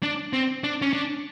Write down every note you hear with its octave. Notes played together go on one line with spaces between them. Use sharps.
D4
C4
D4
C#4
D4